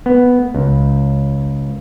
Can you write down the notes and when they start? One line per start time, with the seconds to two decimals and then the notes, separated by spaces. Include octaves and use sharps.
0.06 B3
0.55 C#2